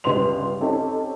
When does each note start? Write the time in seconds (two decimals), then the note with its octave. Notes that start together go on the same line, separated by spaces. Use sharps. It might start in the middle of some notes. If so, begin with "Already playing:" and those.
0.04 G1 C#2 G3 B4 C6 F7
0.61 C4 C#4 D#4 G4 A4